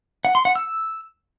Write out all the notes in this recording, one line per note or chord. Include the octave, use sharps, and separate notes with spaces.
F#5
C6
F#5
E6